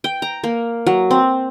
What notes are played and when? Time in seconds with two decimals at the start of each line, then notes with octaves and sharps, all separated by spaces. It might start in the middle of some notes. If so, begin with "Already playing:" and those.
0.04 G5
0.22 A#5
0.44 A#3
0.87 F#3
1.11 C4